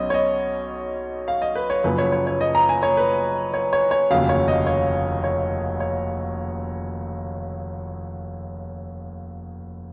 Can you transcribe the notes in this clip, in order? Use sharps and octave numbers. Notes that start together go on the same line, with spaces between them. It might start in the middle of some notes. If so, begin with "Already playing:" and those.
Already playing: B1 B2 F#3 C#4 D#5
C#5
D#5
F5
D#5
B4
C#5
F#1 F#2 C#3 F3 B4
C#5
C#5
C#5
D#5
A#5
G#5
C#5
B4
C#5
C#5
C#5
F1 D#2 C#3 F#3 F5
C#5
D#5
C#5
C#5
C#5